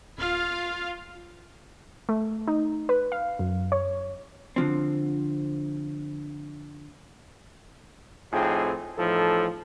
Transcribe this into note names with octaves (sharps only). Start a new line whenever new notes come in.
D1 F4 F5
A3
D#4
B4
F5
F#2
C#5
D3 F3 C4
F2 A2 C4 D#4 F4 G#4
E2 A2 F3 D#4 A4